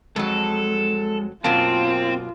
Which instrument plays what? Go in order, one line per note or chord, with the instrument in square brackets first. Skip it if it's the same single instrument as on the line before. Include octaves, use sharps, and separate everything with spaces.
[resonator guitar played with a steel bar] F2 F#3 [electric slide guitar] G#3 [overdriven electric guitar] A4
[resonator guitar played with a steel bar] F#2 B2 A#3 [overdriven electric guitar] C4 [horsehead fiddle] F4 [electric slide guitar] A5